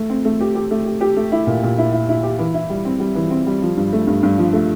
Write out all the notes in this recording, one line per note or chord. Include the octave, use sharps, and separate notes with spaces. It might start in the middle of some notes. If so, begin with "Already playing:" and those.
Already playing: A3
C4
A3
G4
G4
A3
G4
G4
A3
E4
A#2
A#2
E4
E4
E4
G4
E3
E4
G3
C4
G3
E3
C4
G3
F3
G2
A3
G2
G2
F3
A3